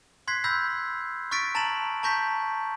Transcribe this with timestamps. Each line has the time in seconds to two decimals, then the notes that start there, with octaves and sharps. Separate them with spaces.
0.28 C6 F#6 G#6 B6 C7
0.44 B5 E6 G6 A#6
1.31 C#6 F6 A6 B6 D7
1.55 A5 A#5 A6 A#6 E7 F#7
2.03 A5 A#5 C#6 G6 A#6 B6